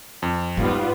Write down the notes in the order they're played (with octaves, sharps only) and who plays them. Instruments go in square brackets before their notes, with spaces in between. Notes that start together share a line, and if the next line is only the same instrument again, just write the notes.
[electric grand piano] F2
[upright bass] G#2 A3 [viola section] G3 B3 F4